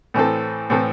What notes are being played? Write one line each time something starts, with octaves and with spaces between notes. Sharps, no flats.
A2 E3 C4 A4
A2 E3 C4 A4